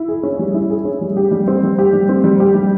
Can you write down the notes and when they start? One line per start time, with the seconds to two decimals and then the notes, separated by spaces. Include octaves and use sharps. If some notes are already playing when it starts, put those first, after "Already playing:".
Already playing: E4
0.08 G#4
0.23 C#4
0.39 G3
0.54 E4
0.70 G#4
0.85 C#4
1.01 G3
1.17 G4
1.31 G3
1.48 C4
1.63 G3
1.79 G4
1.93 G3
2.09 C4
2.24 G3
2.40 G4
2.54 G3